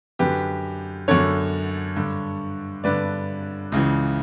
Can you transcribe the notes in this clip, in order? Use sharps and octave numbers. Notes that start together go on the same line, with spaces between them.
F#2 D3 G4 B4
F#2 D3 A4 C#5
G2 D3
G2 D3 B4 D5
C#2 C#3 E3